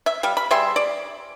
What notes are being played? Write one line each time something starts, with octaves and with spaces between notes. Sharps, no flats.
E5
G3 F5
B5
G3 G#4 E5 C6
D5